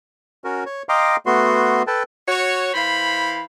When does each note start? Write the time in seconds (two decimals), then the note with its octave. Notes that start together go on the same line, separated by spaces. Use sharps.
0.44 C#4 F#4 A#4
0.66 C#5
0.89 D#5 F5 G5 A#5 C6 D6
1.26 A3 B3 F#4 C6
1.87 A4 B4 G5 A5
2.28 F#4 C#5
2.73 E3 C5 F5 B5